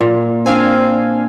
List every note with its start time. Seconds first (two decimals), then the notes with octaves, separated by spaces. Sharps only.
0.01 A#2
0.46 C4 D4 F5 G#5